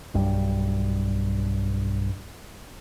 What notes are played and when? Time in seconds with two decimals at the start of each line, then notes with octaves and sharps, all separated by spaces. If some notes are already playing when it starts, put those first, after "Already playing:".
0.14 B1 G2 G3